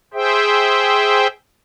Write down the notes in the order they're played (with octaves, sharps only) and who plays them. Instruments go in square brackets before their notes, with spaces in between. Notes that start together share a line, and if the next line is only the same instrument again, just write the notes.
[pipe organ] G#4 C5 E5 G5